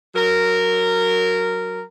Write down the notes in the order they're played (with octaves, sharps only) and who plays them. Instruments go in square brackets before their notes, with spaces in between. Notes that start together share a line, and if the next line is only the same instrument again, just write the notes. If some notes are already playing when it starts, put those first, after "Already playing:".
[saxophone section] F#3 A#4